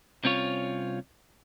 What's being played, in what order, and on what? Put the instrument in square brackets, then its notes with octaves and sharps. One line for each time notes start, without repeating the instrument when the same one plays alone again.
[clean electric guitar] C2 C4 C#4 F4 C#5